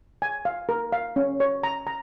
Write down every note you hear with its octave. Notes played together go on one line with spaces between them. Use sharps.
G#5
F5
A#4
F5
C#4
C#5
A#5
A#5